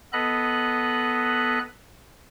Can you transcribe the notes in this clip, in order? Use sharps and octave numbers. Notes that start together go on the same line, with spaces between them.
B3 A4 D#5 B5 F#6